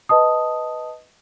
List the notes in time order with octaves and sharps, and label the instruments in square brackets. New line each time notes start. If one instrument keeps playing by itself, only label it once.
[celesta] B4 D#5 A5 D#6